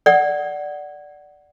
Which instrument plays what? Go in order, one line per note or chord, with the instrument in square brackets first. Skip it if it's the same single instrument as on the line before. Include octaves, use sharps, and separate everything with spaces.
[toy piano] D5 F#5